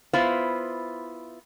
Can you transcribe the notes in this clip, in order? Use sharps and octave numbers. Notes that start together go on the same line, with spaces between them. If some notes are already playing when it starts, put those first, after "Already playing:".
B3 E4 F4 C5